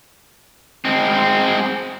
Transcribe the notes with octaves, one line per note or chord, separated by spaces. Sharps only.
G#3 C4